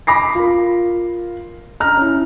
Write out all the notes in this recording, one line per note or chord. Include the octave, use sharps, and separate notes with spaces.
B5 D6 A#6 C7
F4 A#4
A#5 F6
C#4 E4